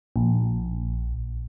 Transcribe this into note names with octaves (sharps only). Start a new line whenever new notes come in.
A#1